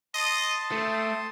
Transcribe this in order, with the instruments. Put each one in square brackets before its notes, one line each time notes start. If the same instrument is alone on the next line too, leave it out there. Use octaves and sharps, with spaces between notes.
[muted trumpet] D#5 [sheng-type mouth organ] A5 C6 D#6
[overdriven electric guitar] A3 [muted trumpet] C4